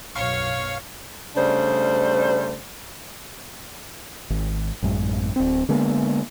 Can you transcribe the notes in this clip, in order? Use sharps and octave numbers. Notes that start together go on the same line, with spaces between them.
B1 F#2 B2 C#5 F5 C#6
C#3 G3 A3 D4 C5
G#1
A1 F#2 G#3
D1 C4
D3 G#3 A#3 B3